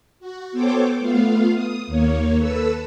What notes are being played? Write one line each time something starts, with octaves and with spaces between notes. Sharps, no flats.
F#4
B3 A4 C5 C#5 G5 D6
A3 B3 F4 F5
D#6
D#2 A#3 C#5
A4 B4 E6